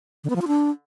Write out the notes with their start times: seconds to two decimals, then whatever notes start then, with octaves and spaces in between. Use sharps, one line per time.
0.24 D3
0.30 B3
0.36 F3
0.42 F4
0.48 D4